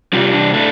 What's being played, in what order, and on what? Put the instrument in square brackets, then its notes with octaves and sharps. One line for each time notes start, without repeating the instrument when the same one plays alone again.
[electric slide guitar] C3 G3 F4
D4
A2 A3 D4